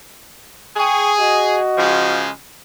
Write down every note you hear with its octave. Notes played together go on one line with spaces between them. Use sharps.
G#4 G5 C#6
F#4 D#5
C#3 F3 G#3